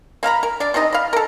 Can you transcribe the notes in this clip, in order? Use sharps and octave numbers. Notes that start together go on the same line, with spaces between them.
A#3 F5 A#5 B5
A#4
D4 D5
C3 E3 D#4 D#5
F5 B5
A4 A#4